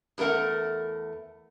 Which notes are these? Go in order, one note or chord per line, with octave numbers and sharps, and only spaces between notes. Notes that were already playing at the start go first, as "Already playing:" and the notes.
E2 G#3 A3 A#4 F#5